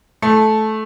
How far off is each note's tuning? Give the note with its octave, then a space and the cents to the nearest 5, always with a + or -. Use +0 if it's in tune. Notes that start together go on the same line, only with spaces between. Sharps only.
A3 -15